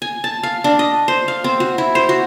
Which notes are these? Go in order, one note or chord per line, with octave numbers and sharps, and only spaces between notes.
G#5
A5
F5
D4
D#5
C5
F5
C4
F#4
E4
C5
F#4